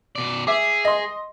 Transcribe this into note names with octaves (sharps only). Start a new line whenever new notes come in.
B2 D5
G#4 E5 D6
D#5 C6